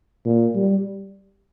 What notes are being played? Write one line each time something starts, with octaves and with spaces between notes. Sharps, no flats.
A#2
G3